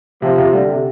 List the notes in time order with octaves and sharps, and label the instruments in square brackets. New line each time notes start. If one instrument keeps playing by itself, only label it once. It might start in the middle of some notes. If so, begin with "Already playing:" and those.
[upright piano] C3 [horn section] F3
[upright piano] C3
[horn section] D3 [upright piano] G3
[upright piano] C3